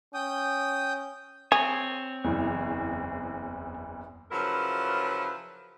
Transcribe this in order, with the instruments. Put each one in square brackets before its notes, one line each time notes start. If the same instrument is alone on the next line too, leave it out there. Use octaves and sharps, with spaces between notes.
[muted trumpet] C#4 [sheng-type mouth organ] G5 D#6 G6
[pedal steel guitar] C4 C#5 [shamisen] G#4
[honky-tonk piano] F#1 E2
[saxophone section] C#3 F3 F#3 E4 A#4 B4